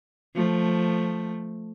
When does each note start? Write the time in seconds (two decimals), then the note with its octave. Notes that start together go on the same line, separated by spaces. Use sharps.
0.36 F3 A3